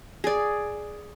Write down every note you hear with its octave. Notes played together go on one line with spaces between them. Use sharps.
G#4 D5